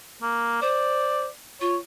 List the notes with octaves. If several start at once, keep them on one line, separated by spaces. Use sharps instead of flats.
A#3
C5 D5
F4 C#5